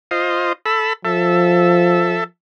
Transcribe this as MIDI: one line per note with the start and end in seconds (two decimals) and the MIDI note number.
0.11 0.53 65
0.11 0.53 72
0.11 0.53 75
0.66 0.93 69
0.66 0.93 83
0.66 0.93 88
1.05 2.25 53
1.05 2.24 69
1.05 2.24 76